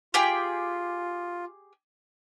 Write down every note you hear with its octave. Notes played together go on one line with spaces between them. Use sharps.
F4 G4 G#4 G5